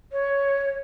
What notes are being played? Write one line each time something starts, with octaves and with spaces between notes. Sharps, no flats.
C#5